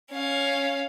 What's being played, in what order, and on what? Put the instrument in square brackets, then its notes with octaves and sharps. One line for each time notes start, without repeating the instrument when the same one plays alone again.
[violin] C#4 F5